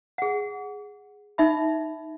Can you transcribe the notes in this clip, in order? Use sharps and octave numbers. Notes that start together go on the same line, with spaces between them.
G#4 F#5
D#4 E5 B5